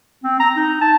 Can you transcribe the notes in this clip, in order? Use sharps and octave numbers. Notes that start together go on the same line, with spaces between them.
C4
A#5
D#4
A5